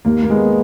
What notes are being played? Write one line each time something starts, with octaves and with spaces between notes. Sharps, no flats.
D#2 A#3
A#3
G#3 B3